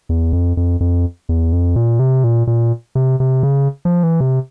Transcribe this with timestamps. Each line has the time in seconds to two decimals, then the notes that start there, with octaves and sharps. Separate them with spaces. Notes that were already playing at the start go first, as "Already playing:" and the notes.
0.09 E2
0.33 F2
0.57 F2
0.80 F2
1.29 E2
1.53 F2
1.76 A#2
1.99 C3
2.24 A#2
2.47 A#2
2.95 C3
3.20 C3
3.43 C#3
3.85 F3
4.03 E3
4.20 C3